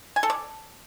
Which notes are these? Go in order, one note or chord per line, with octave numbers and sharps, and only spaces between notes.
G#5
A4
D5